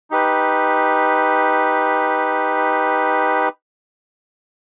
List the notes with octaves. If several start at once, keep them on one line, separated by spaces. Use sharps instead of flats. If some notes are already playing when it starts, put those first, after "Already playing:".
D#4 G4 B4